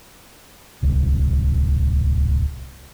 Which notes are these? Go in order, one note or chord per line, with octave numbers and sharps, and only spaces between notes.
D1 C2